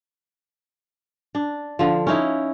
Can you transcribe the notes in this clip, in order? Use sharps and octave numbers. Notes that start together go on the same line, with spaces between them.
D4
D3 F3
C#4 D#4 E4